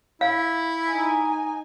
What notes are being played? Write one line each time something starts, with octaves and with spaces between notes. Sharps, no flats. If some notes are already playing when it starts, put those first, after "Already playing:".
E4 F5
D#4 G#5